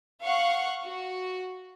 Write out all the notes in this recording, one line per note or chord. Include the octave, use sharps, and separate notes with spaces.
F5 F#5 C#6
F#4